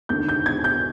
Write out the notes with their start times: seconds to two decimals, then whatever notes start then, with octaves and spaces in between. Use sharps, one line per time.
0.09 D#2 D3 G6
0.29 G6
0.46 G#6
0.64 G6